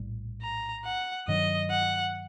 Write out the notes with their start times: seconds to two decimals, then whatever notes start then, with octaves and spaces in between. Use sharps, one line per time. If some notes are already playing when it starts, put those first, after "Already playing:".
Already playing: A#1 A2 G3
0.42 A#5
0.85 F#5
1.28 G2 D#3 F#3 D#5
1.70 F#5